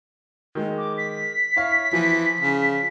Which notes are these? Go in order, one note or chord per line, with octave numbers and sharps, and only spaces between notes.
D#3 G#3
D6
B6
E4 C#5 F5
E3 F3
C#3